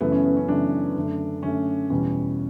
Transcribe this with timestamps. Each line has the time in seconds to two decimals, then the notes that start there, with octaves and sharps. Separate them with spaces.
0.01 F#2 C#3 E3 A3 B3
0.12 C#4
0.25 B3
0.37 C#4
0.48 F#2 C#3 E3 A3 D4
0.96 F#2 D3 A3
1.43 F#2 D3 A3 C#4
1.90 E2 B2 G3 C#4